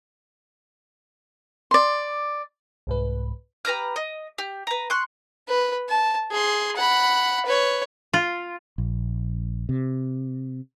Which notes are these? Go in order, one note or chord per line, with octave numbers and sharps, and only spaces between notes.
D5 C6
C2 G#2 B4
G4 B4 A#5 F6
D#5
G4
B4 A#5
C6 C#6 F#6
B4
A5
G#4 C6
F#5 B5
B4 C#5
F4
A#1
C3